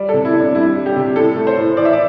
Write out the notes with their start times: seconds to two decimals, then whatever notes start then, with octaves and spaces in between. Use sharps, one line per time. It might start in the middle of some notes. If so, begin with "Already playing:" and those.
Already playing: G3 D5
0.09 C3 A4
0.25 E4
0.34 C3
0.40 D4
0.55 G3 E4
0.75 G3
0.86 G4
0.96 C3
1.16 A2 A4
1.36 A3
1.47 C5
1.57 A2
1.77 E3 D5
1.85 E5
1.93 D5